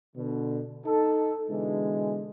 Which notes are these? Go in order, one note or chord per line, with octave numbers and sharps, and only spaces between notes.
B2 D3
D#4 A4
B2 D3 E3 G#3